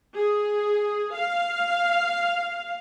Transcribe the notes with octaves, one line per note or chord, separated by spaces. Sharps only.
G#4
F5